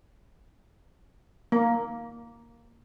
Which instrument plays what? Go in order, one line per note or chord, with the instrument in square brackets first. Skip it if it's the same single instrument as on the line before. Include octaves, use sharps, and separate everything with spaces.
[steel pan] A#3